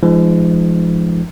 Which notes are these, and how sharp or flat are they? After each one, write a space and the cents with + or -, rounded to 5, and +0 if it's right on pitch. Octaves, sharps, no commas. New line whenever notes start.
F3 -40 G#3 +0 D#4 -40